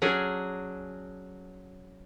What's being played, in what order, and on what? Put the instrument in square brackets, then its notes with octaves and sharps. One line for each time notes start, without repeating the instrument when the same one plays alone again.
[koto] F#3 C#4 D4 G#4